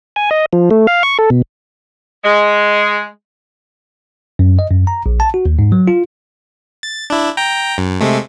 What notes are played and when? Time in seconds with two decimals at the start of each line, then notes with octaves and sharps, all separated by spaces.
0.16 G#5
0.31 D#5
0.53 F3
0.71 A3
0.87 F5
1.03 C#6
1.19 A4
1.30 B2
2.23 G#3
4.39 F#2
4.59 D#5
4.71 F#2
4.87 A#5
5.06 A#1
5.20 A5
5.34 F#4
5.46 D#2
5.59 G#2
5.72 F#3
5.88 F4
6.83 A6
7.10 D4 E4
7.37 G5 A#5
7.78 F#2
8.00 C3 G#3 A3